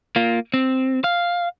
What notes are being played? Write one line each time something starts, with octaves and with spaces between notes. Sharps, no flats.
A#3 F4
C4
F5